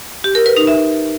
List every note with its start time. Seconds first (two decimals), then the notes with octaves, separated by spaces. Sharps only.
0.24 G4
0.35 A#4
0.46 B4
0.57 D#4
0.67 E5